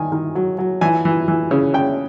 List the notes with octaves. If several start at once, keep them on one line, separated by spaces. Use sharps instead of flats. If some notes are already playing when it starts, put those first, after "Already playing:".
Already playing: D#3 G#5
D#3
F#3
F#3
E3 G#5
E3
E3
C#3
C#3 G5